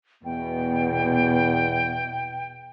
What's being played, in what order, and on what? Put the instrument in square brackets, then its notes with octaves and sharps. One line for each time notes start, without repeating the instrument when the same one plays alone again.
[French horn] E2 [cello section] B2 [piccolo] G5